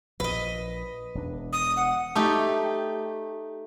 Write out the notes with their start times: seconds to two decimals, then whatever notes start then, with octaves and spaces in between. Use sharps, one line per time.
0.20 A#1 F3 B4 D#5
1.15 E1 D4
1.53 D#6
1.77 F#5
2.15 A3 D#4 G4